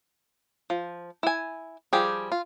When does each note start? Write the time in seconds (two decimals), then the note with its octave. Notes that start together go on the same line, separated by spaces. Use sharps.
0.70 F3
1.23 E4 G#5
1.93 F3 G3 G4 G#4
2.32 F4